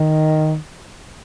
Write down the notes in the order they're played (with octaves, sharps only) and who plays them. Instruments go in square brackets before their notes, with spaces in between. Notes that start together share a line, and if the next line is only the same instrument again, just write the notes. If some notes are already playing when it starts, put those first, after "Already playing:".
Already playing: [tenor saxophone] D#3